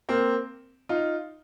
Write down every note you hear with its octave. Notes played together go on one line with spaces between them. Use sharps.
A#3 C4
D#4 F4